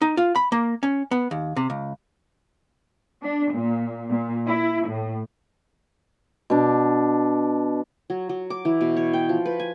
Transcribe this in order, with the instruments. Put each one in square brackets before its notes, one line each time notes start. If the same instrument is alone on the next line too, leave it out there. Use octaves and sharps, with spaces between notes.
[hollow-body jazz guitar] D#4
F4
B5
A#3
C#4
B3
D#2
C3
C#2
[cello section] D4
A#2
A#2
E4
A2
[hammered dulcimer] B2 D4
[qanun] F#3
F#3
D6
E3
B2
C#5
G5
F3
B4
G#5